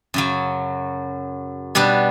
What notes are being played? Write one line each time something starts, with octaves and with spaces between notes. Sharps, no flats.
F#2 C#3 F#3
B2 G3 B3 D4